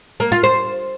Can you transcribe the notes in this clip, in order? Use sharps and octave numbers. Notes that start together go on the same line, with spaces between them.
A#3
F4
C5